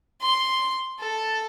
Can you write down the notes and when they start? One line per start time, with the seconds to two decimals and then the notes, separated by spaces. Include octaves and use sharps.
0.22 C6
1.00 A4